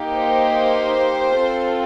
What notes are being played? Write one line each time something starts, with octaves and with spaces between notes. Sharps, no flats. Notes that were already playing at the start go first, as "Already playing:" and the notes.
Already playing: A#3 D#4 G4
C5
C4 F4 A4